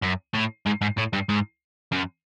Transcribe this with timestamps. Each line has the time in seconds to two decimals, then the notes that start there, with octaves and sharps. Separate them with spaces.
0.03 F#2
0.34 A2
0.66 G#2
0.82 G#2
0.98 A2
1.13 G2
1.29 G#2
1.92 F#2